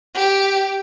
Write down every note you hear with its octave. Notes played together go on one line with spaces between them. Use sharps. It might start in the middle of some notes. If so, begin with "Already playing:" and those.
G4